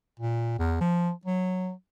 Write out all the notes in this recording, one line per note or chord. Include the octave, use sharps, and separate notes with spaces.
A#2
E2
F3
F#3